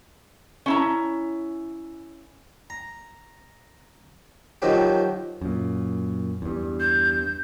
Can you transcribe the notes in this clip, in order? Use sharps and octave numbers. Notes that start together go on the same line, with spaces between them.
C#4 E4 A#5
A#5
D#3 F3 F#3 D#4 G4
F#2 A#2
E2 G2
G6